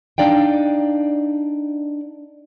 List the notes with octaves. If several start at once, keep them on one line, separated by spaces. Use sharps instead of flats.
D4 D#4 D5 F5 G5